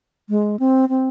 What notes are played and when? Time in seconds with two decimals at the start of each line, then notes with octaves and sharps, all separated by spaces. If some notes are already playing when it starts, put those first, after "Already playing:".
0.29 G#3
0.60 C4
0.89 C4